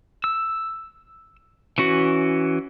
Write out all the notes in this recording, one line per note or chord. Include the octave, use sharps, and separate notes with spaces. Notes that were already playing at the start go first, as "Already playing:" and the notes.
E6
E3 C#4 F#4